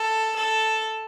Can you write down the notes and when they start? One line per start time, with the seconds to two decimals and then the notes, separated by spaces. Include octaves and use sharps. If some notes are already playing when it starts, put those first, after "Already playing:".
Already playing: A4
0.36 A4